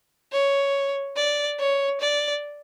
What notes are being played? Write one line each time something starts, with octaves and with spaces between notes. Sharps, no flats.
C#5
D5
C#5
D5